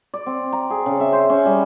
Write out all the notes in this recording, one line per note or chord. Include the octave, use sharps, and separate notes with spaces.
D5
C4
A#5
G#4
C#3
E5
C5
C#4
G3